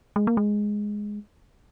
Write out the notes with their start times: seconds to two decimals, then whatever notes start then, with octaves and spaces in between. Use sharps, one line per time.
0.16 G#3
0.27 A#3
0.37 G#3